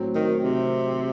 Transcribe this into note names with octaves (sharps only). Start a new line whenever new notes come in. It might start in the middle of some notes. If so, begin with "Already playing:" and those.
Already playing: A2 F#3 C4 F#4
D#3
C3